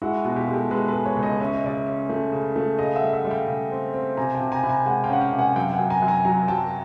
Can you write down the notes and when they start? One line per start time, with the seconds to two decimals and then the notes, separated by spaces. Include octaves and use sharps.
0.02 G#3 E4 F#4
0.25 B2
0.36 F4 G4
0.48 G#3
0.54 G4 A4
0.71 G#3 A4 B4
0.88 A4 B4
0.94 G#3
1.05 B4 C#5
1.17 C#2
1.23 C#5 D#5
1.40 C#4 E5
1.54 D#5
1.64 C#3 D5 E5
1.87 C#4
2.09 A3
2.32 C#3
2.56 A3
2.78 C#3 D#5 F5
2.96 E5 F#5
3.02 G3
3.13 E5 F#5
3.25 G3
3.31 F5 G5
3.47 C#3
3.71 C4
3.94 C4
4.17 C3 G#5 A#5
4.35 G5 A5
4.40 C3
4.52 G#5 A#5
4.63 C3 B5
4.69 G#5 A#5
4.86 G#3 F#5 G#5
5.04 F5 G5
5.09 C#4 F#5
5.21 F5 G5
5.33 C3
5.39 F#5 G#5
5.56 F#2 F5 G5
5.73 F#5 G#5
5.79 F#2
5.90 G#5 A#5
6.02 F#2
6.08 G#5 A#5
6.25 F#3 G#5 A#5
6.48 F#3 G5 A5